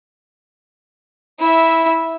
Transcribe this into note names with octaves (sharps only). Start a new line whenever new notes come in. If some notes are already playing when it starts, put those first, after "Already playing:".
E4 E5